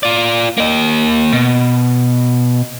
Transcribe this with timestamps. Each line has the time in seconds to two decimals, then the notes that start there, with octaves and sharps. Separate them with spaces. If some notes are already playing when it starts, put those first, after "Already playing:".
0.03 F4 D5
0.58 A#3 D#5
1.33 B2